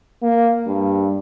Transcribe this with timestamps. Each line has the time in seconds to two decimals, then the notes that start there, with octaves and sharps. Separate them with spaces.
0.22 A#3
0.67 G2